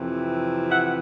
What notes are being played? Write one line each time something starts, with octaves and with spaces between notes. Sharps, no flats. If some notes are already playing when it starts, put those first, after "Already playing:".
Already playing: F2 C3 E3
E5 F#5